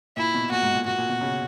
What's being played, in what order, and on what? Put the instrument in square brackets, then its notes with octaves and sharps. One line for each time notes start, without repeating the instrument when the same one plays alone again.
[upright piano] A#2 [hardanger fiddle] E4
[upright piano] B2
[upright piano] A#2 [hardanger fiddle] F#4
[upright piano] G#2
A#2
[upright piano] A#2 [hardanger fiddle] F#4
[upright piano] A#2
B2
C#3